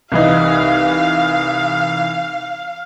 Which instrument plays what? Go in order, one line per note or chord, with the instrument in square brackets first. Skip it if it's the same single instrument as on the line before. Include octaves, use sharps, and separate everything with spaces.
[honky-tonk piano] C2 E3 D#4 [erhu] F5